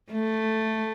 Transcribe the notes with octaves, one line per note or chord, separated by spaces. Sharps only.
A3